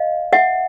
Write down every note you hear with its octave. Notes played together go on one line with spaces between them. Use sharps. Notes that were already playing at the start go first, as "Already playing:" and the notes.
Already playing: D#5 F5
E5 F#5